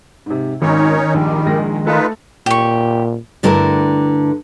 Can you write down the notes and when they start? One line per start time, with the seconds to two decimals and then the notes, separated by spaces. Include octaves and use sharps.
0.26 G#2 C3
0.62 G#1 D#3 C#4 D#4 C#5
1.14 A#1 G#2 G3
1.46 A#1 G#3 A#6
1.87 A3 D#4 F4 A4 B4
2.46 A#2 G4 C#6
3.43 G2 D3 A3 E4 A#4 A5